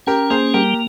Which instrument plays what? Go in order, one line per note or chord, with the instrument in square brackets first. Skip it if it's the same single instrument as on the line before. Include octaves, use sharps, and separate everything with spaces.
[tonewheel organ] C#4 [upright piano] G4 A#4
[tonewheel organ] A#3 [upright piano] G#4 C5
[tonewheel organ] G3 [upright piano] G4 A#4